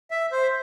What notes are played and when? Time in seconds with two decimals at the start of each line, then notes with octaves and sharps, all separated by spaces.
0.11 E5
0.32 C5